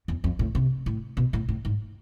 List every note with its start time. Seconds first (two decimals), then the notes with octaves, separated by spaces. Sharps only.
0.08 E2
0.24 F2
0.39 A2
0.55 C3
0.86 A2
1.17 B2
1.33 A2
1.49 A2
1.65 G#2